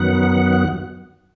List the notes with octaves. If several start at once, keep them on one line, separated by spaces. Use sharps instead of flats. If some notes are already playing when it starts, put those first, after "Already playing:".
Already playing: F#2 D#3 F#3 B3 F#5